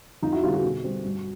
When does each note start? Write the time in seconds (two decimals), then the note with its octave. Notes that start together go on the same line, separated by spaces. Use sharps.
0.22 F2 D#4 F4
0.32 E4 F#4
0.43 D3 G3 C4 F4 G4
0.53 F#4 G#4
0.64 B2
0.84 G3 C4
1.04 G2